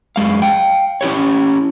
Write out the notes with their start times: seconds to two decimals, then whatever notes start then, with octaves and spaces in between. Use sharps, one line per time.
0.16 F#2 G#3 F5
0.42 F5 G5
1.01 C#4 E4 G4 C#5